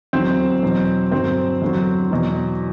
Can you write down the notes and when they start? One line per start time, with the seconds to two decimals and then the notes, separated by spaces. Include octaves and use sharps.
0.13 E2 D3 F#3 C4 C5
0.63 E2 B2 F#3
1.12 G2 D3 F#3 C4 C5
1.62 E2 D3 F#3
2.11 E2 B2 F#3